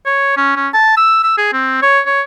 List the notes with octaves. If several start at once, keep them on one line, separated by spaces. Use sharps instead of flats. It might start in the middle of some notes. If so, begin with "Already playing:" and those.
C#5
C#4
C#4
A5
E6
E6
G#4
C4
C#5
C#5